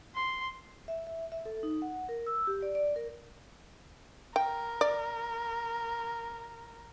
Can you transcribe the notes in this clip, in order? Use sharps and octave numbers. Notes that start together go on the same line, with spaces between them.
C6
E5
E5
E5
A4
D#4
F#5
A#4
E6
G4
D5
D5
A#4
A#4 G5
D5